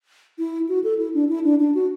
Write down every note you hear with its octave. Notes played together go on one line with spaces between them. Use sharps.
E4
F#4
A4
E4
D4
E4
D4
D4
F#4